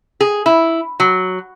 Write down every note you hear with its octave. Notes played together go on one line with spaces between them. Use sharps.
G#4
E4
F#3